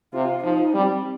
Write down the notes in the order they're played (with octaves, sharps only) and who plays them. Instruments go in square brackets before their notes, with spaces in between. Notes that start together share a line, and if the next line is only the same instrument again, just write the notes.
[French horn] C3 [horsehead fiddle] F4
[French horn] F3 [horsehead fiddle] D#4
[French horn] G3 [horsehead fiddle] C4